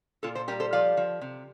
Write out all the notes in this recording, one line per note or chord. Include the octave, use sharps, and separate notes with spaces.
A#2 F4 A4
A4 C5
G3 G4 A#4
A4 C5
F3 D5 F5
F3
C3